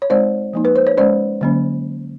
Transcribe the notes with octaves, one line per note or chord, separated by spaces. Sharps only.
C#5
G#3 C4 D#4 C5 D5
F3 A#3 D#4
B4
C5
C#5
G#3 C#4 C5 D5
D3 F#3 A#3 C#4